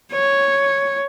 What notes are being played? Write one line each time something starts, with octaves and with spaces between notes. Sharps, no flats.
C#5